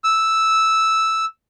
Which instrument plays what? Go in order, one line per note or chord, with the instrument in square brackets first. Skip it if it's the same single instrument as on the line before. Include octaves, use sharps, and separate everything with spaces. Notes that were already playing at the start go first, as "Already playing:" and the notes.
[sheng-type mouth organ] E6